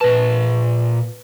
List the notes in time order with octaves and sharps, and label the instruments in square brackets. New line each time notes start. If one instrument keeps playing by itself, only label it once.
[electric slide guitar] A#2 A5 [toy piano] B4